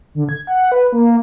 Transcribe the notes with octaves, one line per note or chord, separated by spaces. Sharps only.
D3
G#6
F#5
B4
A#3